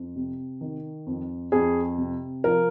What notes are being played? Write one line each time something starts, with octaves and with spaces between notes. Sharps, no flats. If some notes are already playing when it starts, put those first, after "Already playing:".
Already playing: F2
C3
D#3
F2
F2 G#4
C3
F3 A#4